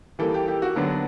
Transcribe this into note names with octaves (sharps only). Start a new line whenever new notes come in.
E3 G3 A#3 A4
G4
G4
F#4
D3 F#3 B3 D4